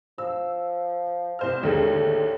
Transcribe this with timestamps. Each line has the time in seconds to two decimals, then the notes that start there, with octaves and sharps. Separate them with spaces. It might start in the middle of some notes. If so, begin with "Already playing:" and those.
0.18 F3 E6
1.39 C2 C5 F6
1.63 D#2 A2 D3 G#3